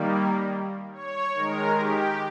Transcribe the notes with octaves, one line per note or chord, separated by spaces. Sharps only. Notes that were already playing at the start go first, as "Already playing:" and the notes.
Already playing: D#3 G3 A#3
C#5
D#3 G#3 A#4
G4